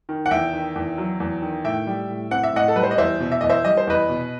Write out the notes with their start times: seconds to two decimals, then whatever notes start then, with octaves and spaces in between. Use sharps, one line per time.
0.09 D#3
0.26 F#5
0.31 E2 E5 G5
0.53 D#3
0.76 E2
0.98 F#3
1.20 E2
1.42 D#3
1.64 A2 E5 G5
1.87 G3
2.09 A2
2.31 C4 F#5
2.43 E5
2.53 A2 D#5 F#5
2.68 A4
2.76 G3 B4
2.83 C5
2.91 D#5
2.98 E2 C5 E5
3.20 B2
3.32 E5
3.41 E2 D#5
3.49 C5 E5
3.65 G3 D#5
3.77 C5
3.87 E2 B4 D#5
4.09 B2